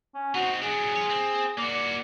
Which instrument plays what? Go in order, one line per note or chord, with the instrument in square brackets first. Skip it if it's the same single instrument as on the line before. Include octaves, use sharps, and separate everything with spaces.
[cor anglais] C#4
[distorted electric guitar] C4 D#4 [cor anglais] F#4
[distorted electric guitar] F#3 D4 [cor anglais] G#4
[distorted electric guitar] F4 C#5
C4
[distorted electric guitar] A#3 F#4 [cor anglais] D5